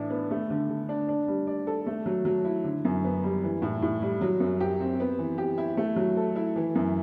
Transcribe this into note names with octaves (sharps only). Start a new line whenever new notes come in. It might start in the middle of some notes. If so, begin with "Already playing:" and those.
Already playing: A2 E3 D4
B3
A3
D3
D3
D4
D4
G3
D5
A4
A3
F#3
F#3
E4
D3
F#2
B3
G3
E3
A2
A2
G3
F#3
F#2
G4
C4
B3
E3
G4
E4
A3
F#3
A4
E4
E3
F#2